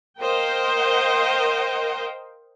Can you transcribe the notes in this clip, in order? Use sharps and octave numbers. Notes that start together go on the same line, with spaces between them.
A#4 C5 D#5 F5 G5